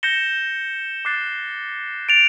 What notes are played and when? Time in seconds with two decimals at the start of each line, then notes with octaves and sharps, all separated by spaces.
0.03 G6 A#6 C#7 E7 G7
1.05 D6 F#6 A6 C7
2.09 A6 D7 F7